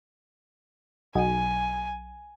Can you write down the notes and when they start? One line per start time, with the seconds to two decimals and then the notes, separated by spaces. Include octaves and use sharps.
1.15 B1 G#5